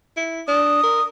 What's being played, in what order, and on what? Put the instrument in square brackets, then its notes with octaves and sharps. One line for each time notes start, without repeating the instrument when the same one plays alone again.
[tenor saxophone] E4
[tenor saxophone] D4 [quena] D#6
[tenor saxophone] A#4